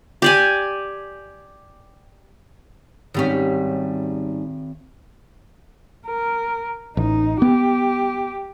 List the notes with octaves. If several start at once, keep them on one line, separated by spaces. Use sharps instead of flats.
G4 D5 G#5
G#2 D#3 G3 C4 C#4
A#4
A1 D#4
B3 G4